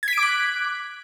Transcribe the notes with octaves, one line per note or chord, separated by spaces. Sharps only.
D6 F#6 G#6 B6 D7